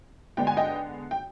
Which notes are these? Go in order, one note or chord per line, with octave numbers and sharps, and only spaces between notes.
D3 G#3 B3 D4 G5
G#5
D#5 G5
G5